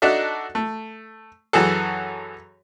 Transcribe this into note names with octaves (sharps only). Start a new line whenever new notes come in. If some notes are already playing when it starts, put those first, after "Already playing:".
D4 D#4 F#4 A4 E5
A3
F#2 E3 F#4 G#4 A4